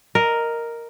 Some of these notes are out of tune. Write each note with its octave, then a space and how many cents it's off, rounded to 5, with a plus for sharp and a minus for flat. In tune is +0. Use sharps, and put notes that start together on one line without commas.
A#4 +0 D#5 +0